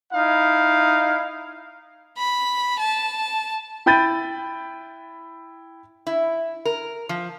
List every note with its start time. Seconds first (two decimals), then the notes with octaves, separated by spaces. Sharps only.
0.13 D#4 E4 F5
2.17 B5
2.79 A5
3.86 E4 G5 B5 G6 A6 D#7
6.07 E4
6.65 A#4
7.09 F3